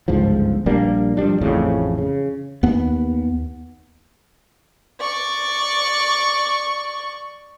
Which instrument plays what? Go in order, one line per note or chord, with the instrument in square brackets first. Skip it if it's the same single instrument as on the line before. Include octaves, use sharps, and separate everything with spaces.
[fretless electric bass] G1 C#2 G#2 F3
A#1 G3 A#3 D4
G1 F3 G3 D4
A1 F2 A2 C#3
C#3
[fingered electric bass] D#2 B3
[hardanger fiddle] D5 C#6